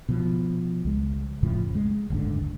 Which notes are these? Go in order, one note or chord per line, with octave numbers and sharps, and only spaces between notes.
B2 F3
C#2 G#3
F2 A2 C#3 F3
G#3
F#1 D2 G#2 D3